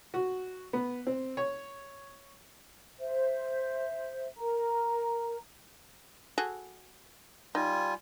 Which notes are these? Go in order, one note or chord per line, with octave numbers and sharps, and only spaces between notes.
F#4
B3
C4
C#5
C5 E5
A#4 A#5
F#4 G#4 A4
G3 D#4 F4 G#5